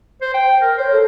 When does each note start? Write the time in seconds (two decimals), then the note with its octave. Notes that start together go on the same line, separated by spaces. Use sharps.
0.22 C5
0.34 G5
0.62 A#4
0.78 C5 C#5
0.92 A4